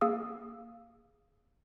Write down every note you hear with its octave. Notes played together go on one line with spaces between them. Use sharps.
A#3 G#4 F5 D#6 E6